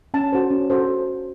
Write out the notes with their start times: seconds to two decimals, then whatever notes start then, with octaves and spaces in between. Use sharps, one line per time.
0.14 C#4 A5
0.33 F#4 A4 C5
0.50 C#4
0.70 F#4 A4 C5